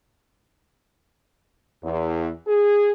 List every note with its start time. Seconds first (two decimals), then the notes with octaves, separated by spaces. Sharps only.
1.83 E2
2.48 G#4